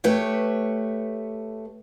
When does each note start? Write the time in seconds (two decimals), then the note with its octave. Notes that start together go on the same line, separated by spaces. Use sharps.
0.04 A3 G4 B4 C#5